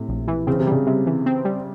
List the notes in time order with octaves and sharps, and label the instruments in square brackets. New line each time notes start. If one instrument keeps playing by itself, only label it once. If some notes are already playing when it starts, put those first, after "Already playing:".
Already playing: [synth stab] A2 [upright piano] C3
[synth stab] A#1
E3
[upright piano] C#3 [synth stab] C4
[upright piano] C3
[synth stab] G3
[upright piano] C#3
[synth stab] C3
E3
C4
G3